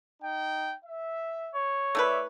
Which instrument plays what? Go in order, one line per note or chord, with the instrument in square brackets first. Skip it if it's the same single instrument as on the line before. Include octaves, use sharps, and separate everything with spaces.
[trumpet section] D#4 G5
E5
[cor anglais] C#5
[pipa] A3 E4 B4 [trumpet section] D5 E5